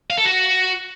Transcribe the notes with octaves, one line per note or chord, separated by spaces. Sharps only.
F5
A4
F#4